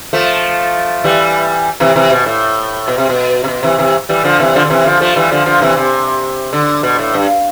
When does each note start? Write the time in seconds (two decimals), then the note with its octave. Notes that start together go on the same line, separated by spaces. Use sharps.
0.13 F3 A3
1.04 E3 G3
1.80 C3 E3
1.96 C3 E3
2.11 B2
2.26 A2
2.88 B2
2.98 C3
3.09 B2
3.44 C3
3.48 B2
3.63 C3 E3
3.78 C3 E3
4.09 E3 G3
4.24 D3 F3
4.40 C3 E3
4.55 D3 F3
4.65 D3
4.70 C3 E3
4.86 D3 F3
5.00 F3 A3
5.16 E3 G3
5.31 D3 F3
5.46 D3 F3
5.62 C3 E3
5.77 C3
6.53 D3
6.83 B2
6.99 A2
7.14 G2